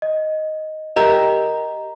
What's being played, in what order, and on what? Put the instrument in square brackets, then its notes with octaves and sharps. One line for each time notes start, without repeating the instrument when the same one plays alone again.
[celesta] D#5
[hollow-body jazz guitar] G4 A#4 E5 [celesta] D#5 A#5